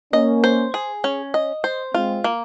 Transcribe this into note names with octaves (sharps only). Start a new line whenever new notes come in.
A#3 C#4 D#5
C5
G#4
C#4
D#5
C5
G#3 C4 F4
A#3